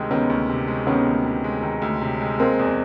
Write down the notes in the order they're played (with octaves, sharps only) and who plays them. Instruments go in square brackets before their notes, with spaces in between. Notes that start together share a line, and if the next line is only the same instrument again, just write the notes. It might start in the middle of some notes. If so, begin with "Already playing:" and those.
Already playing: [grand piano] D2 C3 D#3 G#3
[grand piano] D#3 [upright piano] B3 C#4
[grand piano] D2
C3
G#3
[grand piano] D#3 [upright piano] B3 C#4
[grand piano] D2
C3
G#3
D#3
D2
C3
G#3
[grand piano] G#3 [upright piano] A#3 C4
[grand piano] E2